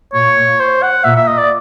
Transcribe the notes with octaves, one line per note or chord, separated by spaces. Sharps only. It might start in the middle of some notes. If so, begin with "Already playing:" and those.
A#2 C#5
C5
F#5
A#2 E5
E5
D#5
D5